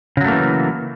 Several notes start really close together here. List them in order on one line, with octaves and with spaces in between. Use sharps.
C#3 F#3 A3 A#3 E3